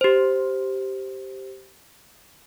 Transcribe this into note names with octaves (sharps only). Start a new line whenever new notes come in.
G4 C5